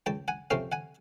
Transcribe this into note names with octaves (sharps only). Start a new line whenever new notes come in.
C#2 G5 A5
F#5 G#5
C3 F3 A3 C#4 F5 G5
F#5 G#5